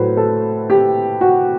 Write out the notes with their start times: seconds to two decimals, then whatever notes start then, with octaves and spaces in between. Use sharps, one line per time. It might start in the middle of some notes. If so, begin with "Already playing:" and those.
Already playing: A2 F#3 A3 B4 C5
0.17 A4
0.70 G4
1.21 F#4